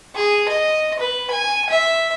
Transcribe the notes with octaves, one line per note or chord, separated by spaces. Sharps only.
G#4
D#5
B4
G#5
E5